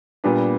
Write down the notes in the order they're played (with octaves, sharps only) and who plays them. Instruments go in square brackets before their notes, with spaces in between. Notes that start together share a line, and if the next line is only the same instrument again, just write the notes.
[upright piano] A#2 G3 B3 D4